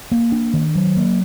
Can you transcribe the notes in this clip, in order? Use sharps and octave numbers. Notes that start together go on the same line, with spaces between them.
A#3
D4
D#3
F#3
A#3